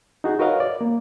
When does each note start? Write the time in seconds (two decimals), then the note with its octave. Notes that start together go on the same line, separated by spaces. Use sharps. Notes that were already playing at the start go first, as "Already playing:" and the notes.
0.24 D#4 F#4 G#4
0.39 F#4 A#4 B4 C#5 D#5 F5
0.60 D5
0.81 A#3